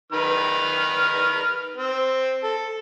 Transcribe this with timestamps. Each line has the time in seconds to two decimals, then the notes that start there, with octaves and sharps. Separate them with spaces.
0.12 D#3 B4 F6
1.77 C4
2.44 A4